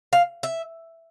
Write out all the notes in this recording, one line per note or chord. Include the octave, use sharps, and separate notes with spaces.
F5
E5